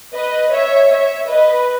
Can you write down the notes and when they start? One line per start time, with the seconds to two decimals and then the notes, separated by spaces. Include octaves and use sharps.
0.14 B4 D#5
0.52 C#5 E5
0.90 C#5 E5
1.28 B4 D#5